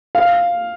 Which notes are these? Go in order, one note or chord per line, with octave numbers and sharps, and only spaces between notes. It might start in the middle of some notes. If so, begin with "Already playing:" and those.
F5